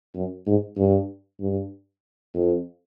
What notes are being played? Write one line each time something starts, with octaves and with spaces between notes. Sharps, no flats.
F#2
G#2
G2
G2
F2